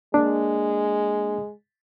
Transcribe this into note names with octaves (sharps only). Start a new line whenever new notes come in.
G#3 A#3 D4